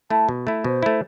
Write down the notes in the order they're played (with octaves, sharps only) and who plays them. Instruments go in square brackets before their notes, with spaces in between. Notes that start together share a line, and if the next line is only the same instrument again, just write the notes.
[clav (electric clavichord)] A3 E4 [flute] A5
[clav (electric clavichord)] B2
A3 E4
[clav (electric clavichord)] B2 [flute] C5
[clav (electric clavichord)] A3 E4